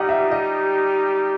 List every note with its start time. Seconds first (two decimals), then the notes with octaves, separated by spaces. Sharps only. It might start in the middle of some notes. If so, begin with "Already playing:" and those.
Already playing: G3 D#4 G4 D#5 F#5
0.09 E5
0.31 D#5